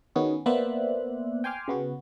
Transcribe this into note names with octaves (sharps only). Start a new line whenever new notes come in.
D#3 B3 C#4 F#4 G#4
A#3 B3 C5 D5 E5 F#6
G5 G#5 C6 D6 F6
C#3 B3 F#4